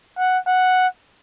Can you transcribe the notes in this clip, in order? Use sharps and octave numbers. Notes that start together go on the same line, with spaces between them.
F#5
F#5